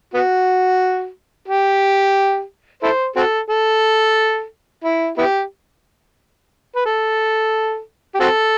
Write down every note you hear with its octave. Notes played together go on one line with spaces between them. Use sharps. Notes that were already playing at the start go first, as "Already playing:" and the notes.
B3 F#4
G4
E4 A4 C5
C4 F#4 A4
A4
E4
B3 E4 G4
B4
A4
G4
C4 F#4 A4